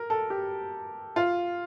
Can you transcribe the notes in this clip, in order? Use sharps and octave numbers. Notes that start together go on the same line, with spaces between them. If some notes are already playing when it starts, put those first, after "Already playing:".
Already playing: A#4
A4
G4
F4